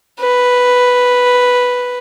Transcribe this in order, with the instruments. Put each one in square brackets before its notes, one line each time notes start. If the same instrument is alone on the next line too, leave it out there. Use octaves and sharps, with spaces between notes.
[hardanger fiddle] B4